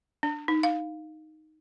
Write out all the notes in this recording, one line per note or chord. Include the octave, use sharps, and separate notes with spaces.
D4
D#4
F5